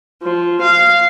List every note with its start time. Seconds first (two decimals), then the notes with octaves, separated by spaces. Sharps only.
0.22 F3
0.62 F5